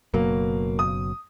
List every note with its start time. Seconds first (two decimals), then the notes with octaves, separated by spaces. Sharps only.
0.14 F#1 B2 F#3 A#3
0.79 D#6